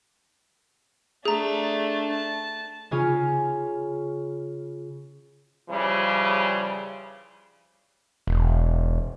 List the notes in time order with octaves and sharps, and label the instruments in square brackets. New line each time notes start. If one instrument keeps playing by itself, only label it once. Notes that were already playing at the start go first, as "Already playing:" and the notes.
[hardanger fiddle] A3 D4 [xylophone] G#4 A#5
[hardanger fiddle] A5
[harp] C#3 C#4 F4
[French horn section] C#3 E3 F3 G3
[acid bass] E1